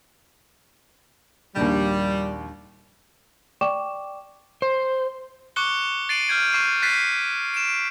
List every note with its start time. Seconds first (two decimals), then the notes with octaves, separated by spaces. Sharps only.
1.56 A#1 D#2 G3
3.61 D5 G5 C#6 D6 E7
4.62 C5
5.56 C#6 D6 F#6 C#7 G7
6.09 A6 C7 D7 D#7 F#7
6.28 F6 G6 G#6 D7
6.52 C#6 C7 D#7
6.82 F#6 A6 B6 C7 D#7
7.54 D7 E7